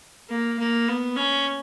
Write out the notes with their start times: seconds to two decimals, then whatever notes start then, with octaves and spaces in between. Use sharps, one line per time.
0.30 A#3
0.59 A#3
0.88 B3
1.16 C#4